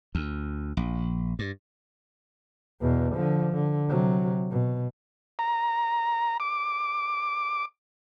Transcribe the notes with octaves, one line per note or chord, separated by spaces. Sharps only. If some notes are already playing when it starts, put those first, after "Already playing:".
D2
A#1
G2
E2 B2
D3 F3
D3
C3 F#3
B2
A#5
D6